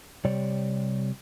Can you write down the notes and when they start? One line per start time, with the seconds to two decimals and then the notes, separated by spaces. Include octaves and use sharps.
0.25 C3 G3 C#5 D5